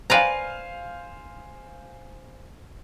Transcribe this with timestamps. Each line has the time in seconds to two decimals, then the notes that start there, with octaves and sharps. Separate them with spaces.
0.10 B4 C5 D5 F5 G#5 A#5